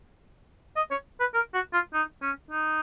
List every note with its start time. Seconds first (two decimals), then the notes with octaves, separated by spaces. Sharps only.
0.76 D#5
0.91 C#5
1.20 B4
1.34 A#4
1.54 F#4
1.73 F4
1.93 D#4
2.22 C#4
2.51 D#4